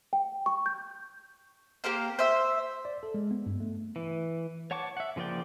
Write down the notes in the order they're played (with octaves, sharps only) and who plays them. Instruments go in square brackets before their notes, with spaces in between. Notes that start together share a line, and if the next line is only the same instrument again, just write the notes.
[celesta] G5
C#6
G6
[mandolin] A#3 G4 A#4 C5
C5 E5
[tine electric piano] D5
A4
G#3
B3
G2
A3
[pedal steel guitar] E3
C#5 F#5 A5 C#6 D6
E5 F#5
C#3 F3 A#3 D5 G5